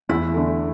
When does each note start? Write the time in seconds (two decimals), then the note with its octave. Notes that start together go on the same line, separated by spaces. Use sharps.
0.09 E2 E4
0.34 D3 A3